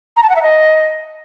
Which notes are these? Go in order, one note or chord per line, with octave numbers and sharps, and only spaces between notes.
A#5
A5
F#5
E5
D#5